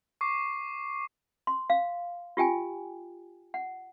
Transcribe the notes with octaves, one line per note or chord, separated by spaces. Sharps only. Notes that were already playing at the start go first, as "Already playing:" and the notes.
C#6 D6 C7
C6
F5
F4 G4 G5 G#5
F#5